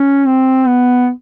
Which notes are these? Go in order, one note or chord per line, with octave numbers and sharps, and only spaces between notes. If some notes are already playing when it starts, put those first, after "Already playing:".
Already playing: C#4
C4
B3